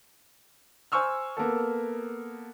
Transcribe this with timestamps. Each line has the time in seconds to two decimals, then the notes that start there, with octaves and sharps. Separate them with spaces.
0.92 C5 G#5 C#6 E6 F6
1.37 A#3 B3 A4